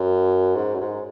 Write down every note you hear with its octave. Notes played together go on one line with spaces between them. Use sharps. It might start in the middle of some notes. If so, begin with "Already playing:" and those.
Already playing: F#2
G#2
F#2
G#2